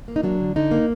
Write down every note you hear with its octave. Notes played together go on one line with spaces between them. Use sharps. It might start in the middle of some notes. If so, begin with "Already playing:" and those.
A#3
D#4
F#3 D4
D3
D3 D#4
A#3